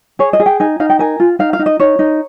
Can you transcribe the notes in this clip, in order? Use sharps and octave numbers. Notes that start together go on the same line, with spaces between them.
G#4 C#5
D#5
G#4
G5
D#4 G#5
D#4 F5
G5
A#4 G#5
F4
D#4 F5
F5
D#4
D#5
D#4 C#5
D#4